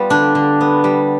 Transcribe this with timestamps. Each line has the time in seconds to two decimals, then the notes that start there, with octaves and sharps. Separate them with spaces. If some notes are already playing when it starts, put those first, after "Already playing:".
Already playing: G3 B3 F4
0.10 D3 D4
0.35 D3
0.61 B3
0.84 G3